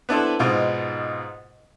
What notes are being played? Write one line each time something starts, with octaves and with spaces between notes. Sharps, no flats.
B3 D4 E4 A4 C5
G#2 B2 D#4 F4